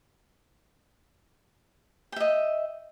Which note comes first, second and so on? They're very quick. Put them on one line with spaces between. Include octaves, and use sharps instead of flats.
G5 E5 D#5